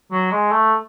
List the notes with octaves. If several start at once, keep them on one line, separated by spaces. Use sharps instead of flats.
F#3
G#3
A3